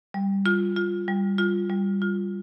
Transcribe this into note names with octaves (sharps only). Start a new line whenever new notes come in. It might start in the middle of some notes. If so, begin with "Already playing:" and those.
G3
F4
F4
G3
F4
G3
F4